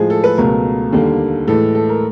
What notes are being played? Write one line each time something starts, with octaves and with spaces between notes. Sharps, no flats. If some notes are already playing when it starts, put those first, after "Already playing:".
Already playing: A2 F3 G#3 G#4
A4
B4
C#2 B2 F#3 A3 A#4
D#2 D3 G3 A#3
A2 E3 G#3 A4
A4
A#4